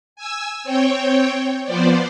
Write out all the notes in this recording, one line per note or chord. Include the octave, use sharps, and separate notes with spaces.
G#5 E6
C4 C#5 G5
F3 B3 C5 D5